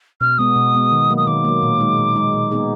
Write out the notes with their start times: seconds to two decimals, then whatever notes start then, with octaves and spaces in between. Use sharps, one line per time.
0.21 B2 F6
0.38 G#3 B3 D#6
0.56 B2
0.74 G#3 B3
0.92 D#3
1.10 F#3 A#3
1.17 D#6
1.27 D#3 D6
1.45 F#3 A#3
1.62 A#2
1.80 G#3 D#4
1.98 A#2
2.16 G#3 D#4
2.34 A#2
2.51 G#3 B3 D#4 G#4